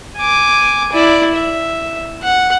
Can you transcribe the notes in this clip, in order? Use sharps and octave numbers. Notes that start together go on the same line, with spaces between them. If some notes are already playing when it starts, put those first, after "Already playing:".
G#5 D6
E4 D5
E5
F#5